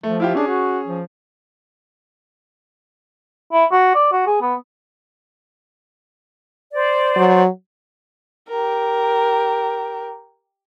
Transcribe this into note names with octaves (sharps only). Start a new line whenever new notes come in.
F3 A3
E4 F4 G4
C#4 D4 G#4
F#4
F3
E4
F#4
D5
F#4
G#4
B3
C5 D5
F#3
G4 A#4